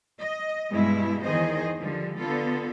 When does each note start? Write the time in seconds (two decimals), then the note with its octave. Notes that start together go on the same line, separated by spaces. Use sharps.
0.19 D#5
0.70 G2 B2 G#3 E4
1.24 E2 D#3 G#4 C5 D#5
1.80 D3 F3 G3
2.19 D3 B3 F4 A4